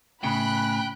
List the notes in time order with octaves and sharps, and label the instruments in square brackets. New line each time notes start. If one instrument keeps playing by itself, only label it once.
[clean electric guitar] A2 C#3 [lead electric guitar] G5 [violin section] B5 F#6